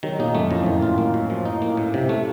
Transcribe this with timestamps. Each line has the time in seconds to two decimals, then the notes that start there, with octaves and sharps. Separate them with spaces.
0.03 D#3 F#3
0.19 A#2 D#4
0.35 F#2 A3
0.50 F2 A2
0.66 A2 D#3
0.82 F4
0.98 A#3
1.14 F#2
1.30 F3
1.45 D#4
1.62 A#3
1.77 A2
1.94 C3
2.09 A3